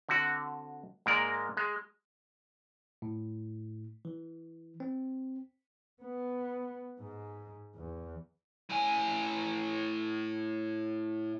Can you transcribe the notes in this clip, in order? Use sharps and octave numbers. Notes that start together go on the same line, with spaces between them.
D3 C4 F#4
G#2 G#3 A#3 A#4 D5
G#3
A2
E3
C4
B3
G#2
E2
A2 G#5